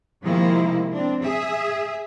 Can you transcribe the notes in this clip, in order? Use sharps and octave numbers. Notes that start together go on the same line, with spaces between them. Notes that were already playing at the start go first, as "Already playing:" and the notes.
C3 D#3 F3 G#3 A#3 E4
C4 D4
G#4 E5